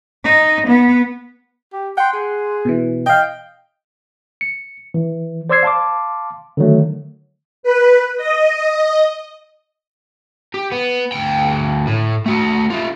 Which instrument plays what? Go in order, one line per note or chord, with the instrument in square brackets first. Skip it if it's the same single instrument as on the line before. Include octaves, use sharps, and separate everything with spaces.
[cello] D#4
B3
[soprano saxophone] G4
[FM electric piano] F#5 C6 [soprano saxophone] G5
[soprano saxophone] G#4
[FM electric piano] B2 E3
[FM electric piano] D#5 F5 [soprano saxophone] G5
[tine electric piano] C#7
E3
C5 D5 C6 E6 G#6 C7
F5 A5 C6 D6
D3 D#3 F#3 A3
[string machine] B4
D#5
[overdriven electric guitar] G4
B3
D2 G5
A2
A3 F#4
D#4 F4